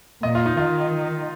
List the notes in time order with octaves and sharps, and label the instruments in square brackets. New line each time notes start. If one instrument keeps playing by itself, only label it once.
[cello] A#2 [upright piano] D#5
[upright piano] F4
D#4
[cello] D#3 [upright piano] F4